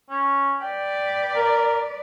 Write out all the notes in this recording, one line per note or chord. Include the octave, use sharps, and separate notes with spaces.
C#4
B4 D5 G5
A#4